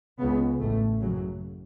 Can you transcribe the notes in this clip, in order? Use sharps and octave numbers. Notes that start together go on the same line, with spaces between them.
C#2 C#3 B3
A1 A2 A3
F#1 F#2 C#3 F#3